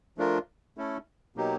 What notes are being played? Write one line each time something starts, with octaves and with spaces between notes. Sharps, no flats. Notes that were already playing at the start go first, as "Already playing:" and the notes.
F3 A3 D4 F4 A#4
A3 C#4 E4 A4
B2 F#3 A#3 D#4 G4